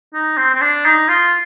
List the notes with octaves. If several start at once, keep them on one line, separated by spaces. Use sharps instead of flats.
D#4
C4
C4
D4
D#4
F4